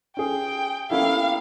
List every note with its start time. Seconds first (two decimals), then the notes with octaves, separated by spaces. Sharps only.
0.17 C#4 G#4 G5
0.90 A#3 B3 C#4 E4 G4 A4 F5